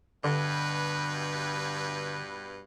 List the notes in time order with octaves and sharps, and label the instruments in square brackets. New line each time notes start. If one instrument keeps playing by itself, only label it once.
[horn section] G2 B2 B4 [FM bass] D3